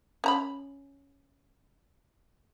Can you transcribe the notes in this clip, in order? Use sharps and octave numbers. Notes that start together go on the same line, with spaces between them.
C#4 A#5 B5